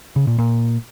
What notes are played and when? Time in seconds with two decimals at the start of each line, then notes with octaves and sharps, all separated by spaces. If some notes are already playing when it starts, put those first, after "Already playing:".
0.16 C#3
0.27 A#2
0.38 A#2